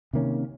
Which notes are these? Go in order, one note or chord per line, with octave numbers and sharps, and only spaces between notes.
C3 D#3 A#3 C#4